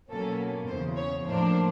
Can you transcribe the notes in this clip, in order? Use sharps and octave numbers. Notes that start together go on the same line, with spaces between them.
B2 F#3 A#3 C#4 A4
E2 C#3 E3 C5
C#5
A2 F3 A#3 D4 C5